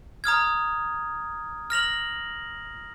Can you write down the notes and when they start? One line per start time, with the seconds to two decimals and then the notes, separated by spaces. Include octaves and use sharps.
0.24 A#5 D#6 F6 G#6
1.70 F6 A#6 F7 F#7